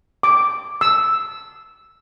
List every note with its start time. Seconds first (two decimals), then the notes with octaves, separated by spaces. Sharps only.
0.23 D6
0.81 E6